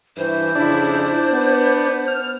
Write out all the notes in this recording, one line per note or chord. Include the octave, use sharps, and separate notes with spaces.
G2 E3 C5
F2 C#3 D4 E4
B3
F6